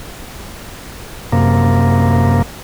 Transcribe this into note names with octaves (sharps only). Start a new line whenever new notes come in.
F#2 C3 A#3